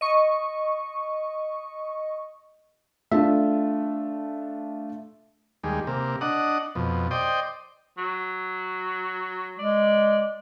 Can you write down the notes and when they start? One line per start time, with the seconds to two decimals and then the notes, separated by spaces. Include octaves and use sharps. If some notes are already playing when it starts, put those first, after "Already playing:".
0.01 D#5 C#6
3.12 A3 D4 F4 E5
5.63 D#2 G3 G#3
5.87 C3 A#3
6.21 D4 D#5 F#5
6.75 F2 B2
7.11 C5 D5 D#5 G5
7.98 F#3
9.59 G#3 D5